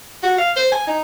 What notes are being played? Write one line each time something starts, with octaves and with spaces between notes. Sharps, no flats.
F#4
F5
C5
G#5
D#4